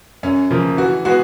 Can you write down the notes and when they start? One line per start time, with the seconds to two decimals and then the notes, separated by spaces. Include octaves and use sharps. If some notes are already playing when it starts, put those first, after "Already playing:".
0.23 F#2 C#4
0.51 C#3 F3 A#3
0.77 E3 F#4
1.05 G#3 B3 F#4